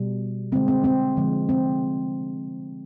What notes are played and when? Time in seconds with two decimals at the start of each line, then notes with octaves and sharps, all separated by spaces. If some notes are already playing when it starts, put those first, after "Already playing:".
Already playing: B2 G3
0.52 D3 G#3 C4
0.68 C4
0.84 C4
1.17 D3 F3 G#3
1.49 C4